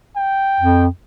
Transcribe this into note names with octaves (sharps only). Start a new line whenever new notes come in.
G5
F2